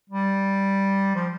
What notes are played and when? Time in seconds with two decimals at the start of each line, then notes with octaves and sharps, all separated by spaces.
0.10 G3
1.15 F3